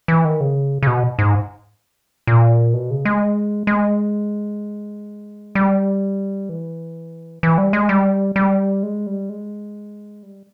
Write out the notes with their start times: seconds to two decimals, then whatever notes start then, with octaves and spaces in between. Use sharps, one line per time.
0.08 E3
0.25 D#3
0.40 C#3
0.83 C#3
0.87 B2
1.19 G#2
2.27 A#2
2.74 B2
2.90 C#3
3.05 G#3
3.67 G#3
5.55 G3
6.49 E3
7.43 E3
7.58 G3
7.73 G#3
7.89 G3
8.36 G3
8.83 G#3
9.07 G3
9.29 G#3
10.23 G3